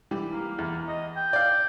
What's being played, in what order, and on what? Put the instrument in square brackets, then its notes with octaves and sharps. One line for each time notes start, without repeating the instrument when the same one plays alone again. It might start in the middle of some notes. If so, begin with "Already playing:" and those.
[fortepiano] E3 G3
[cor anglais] A#3
[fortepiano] E2
[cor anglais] D#5
G5
[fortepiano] D5 F5